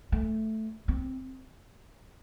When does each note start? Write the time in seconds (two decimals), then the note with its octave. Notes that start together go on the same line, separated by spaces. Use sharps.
0.12 A3
0.88 C4